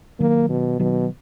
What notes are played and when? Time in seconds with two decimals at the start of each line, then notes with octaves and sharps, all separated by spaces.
0.20 D#3 F#3 A#3
0.49 B2
0.79 B2 D#3 F#3